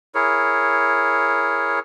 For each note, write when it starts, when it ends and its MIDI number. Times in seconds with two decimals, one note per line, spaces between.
0.15 1.79 64
0.15 1.79 68
0.15 1.79 70
0.15 1.79 73